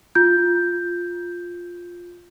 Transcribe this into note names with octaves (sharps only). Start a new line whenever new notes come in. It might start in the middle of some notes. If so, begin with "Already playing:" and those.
F4 G6